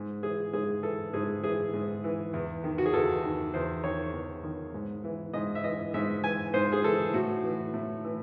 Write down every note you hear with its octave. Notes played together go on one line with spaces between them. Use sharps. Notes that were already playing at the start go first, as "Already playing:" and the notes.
Already playing: G#2
E3 G#4
G#2 G#4
E3 A4
G#2 G#4
E3 G#4
G#2
E3
E2
D#3
F#4
G#4
E2 A4
D#3
E2 C5
D#3 C#5
E2
D#3
G#2
E3
G#2 D#5
E5
E3 D#5
G#2 E5
E3 G#5
G#2 C5
G#4
E3 A4
A2 F#4
E3
A2
E3